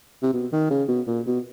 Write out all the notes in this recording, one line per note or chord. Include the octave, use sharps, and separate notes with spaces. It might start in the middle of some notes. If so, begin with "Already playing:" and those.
C3
B2
D#3
C#3
B2
A#2
B2